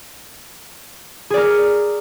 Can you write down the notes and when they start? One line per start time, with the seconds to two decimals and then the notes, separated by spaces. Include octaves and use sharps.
1.30 G#4
1.34 D5
1.37 A#4